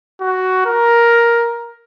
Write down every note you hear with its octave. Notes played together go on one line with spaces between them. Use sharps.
F#4
A#4